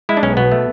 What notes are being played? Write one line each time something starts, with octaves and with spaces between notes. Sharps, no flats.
G#3 E4
D4
B1 C#4
B2 B3
A3